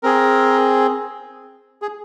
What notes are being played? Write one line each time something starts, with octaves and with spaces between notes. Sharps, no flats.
C4 G#4 A#4
G#4